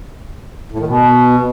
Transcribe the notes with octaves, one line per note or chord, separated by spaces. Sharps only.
A2
D#3
B2